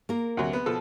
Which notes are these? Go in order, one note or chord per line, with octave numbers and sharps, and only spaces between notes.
A#3 A#4
D2 C3 F#3
B3
B2 F3 A4